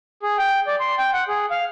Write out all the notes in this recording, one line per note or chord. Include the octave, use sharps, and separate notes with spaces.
G#4
G5
D5
C6
G5
F#5
G#4
F5